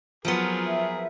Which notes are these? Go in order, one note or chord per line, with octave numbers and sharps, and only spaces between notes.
F3 F#3 B3 F4 G#4 A#4
E5